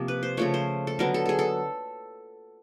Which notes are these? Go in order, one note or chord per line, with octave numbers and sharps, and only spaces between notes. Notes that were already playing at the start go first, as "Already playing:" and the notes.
Already playing: C3 F3 A#3
B4
C5
C#3 F3 A3 C#5
C5
A4
D3 F#3 B3 A#4
A4
G#4 A4
A4